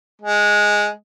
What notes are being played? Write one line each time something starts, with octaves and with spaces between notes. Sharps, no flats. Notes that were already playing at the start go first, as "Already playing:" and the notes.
G#3